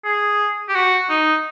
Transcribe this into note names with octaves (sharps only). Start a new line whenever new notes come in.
G#4
G4
F#4
D#4